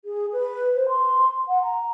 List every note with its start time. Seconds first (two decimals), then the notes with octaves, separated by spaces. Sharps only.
0.05 G#4
0.33 B4
0.75 C5
0.89 C6
1.48 F#5
1.63 A#5